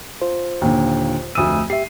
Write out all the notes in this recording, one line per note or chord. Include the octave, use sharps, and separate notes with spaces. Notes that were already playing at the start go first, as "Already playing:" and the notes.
F4 C5
D#2 A#2 D3
F1 D2 D#6 E6 D#7
G4 E5 C7